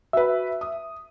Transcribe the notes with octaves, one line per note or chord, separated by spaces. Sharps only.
F#4 B4 E5
D#6